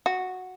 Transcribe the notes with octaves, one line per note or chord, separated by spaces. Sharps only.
F#4